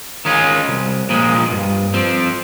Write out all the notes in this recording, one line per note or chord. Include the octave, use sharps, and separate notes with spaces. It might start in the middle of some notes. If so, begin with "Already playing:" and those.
D#3 G#3 C#4 F4
C2
A#2 F3 G#3
G2
F3 C4